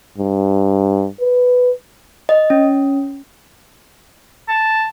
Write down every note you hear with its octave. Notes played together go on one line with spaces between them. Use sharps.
G2
B4
D#5
C#4
A5